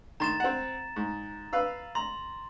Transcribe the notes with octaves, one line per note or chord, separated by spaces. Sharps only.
D#3 A#5 C6 A6 E7
C4 F#5
G#2
B4 F5 E6
A#5 C6